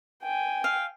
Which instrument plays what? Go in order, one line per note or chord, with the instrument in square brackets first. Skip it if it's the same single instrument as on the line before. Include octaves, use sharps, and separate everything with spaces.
[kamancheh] G5 G#5
[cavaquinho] F5